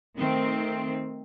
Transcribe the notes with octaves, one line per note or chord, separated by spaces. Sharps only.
D#3 A3 C4